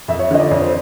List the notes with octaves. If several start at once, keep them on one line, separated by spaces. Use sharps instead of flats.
F2 E5
C#5
D3 F3 D#5
D5
F2 C#5
C5